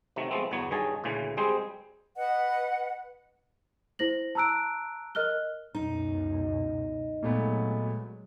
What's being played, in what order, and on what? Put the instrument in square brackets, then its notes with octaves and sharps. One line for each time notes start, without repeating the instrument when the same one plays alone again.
[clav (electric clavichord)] C3 D#3 F#3 A3
F3 G#3 A3 B3 C4
G1 E2 F#3 B3 C#5
G2 D#3 G#4 C#5 G#5 A5
D2 A#2 C#3 E3
G3 G#3 C4 G#4 C5
[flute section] B4 D#5 F#5
[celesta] E4 C5 A#6 F#7
A5 A#5 E6 F#6 D7
A#4 D#5 F6 F#6 G7
[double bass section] C#2 F#2 B2 [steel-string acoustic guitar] D#4
[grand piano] A#2 A3 B3 [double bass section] F#3 G#3